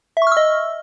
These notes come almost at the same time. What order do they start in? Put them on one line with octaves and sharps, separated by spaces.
E5 C#6 F6 E6 D#5